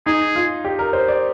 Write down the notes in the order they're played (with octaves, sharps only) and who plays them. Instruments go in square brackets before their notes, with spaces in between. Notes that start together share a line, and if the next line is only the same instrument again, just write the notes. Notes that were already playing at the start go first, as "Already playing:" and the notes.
[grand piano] D#4 [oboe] G#4
[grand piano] F4
G4
A#4
C5
D5